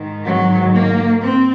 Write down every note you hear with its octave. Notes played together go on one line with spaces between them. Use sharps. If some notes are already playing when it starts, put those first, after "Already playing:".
Already playing: G#2 D#3
F#3
A#3
C4